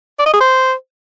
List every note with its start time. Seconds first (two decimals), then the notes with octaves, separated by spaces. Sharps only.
0.19 D5
0.26 D#5
0.33 G#4
0.40 C5